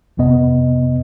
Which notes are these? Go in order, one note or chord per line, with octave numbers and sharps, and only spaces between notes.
G#1 F2 C3 B3 D#5